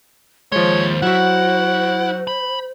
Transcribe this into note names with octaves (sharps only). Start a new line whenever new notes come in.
D#2 F3 G#3 C5 C#5 C6
F#3 E4 F#4 F#5
B5